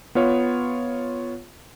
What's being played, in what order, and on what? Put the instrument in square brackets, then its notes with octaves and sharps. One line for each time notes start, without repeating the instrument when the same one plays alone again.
[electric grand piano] B3 F4 C#5